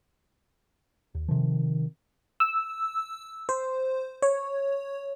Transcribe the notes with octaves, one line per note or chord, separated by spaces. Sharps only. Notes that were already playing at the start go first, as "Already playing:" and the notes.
D#2
C3 D#3 F3
E6
C5
C#5